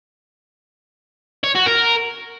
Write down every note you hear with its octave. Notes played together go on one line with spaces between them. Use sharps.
C#5
F#4
A#4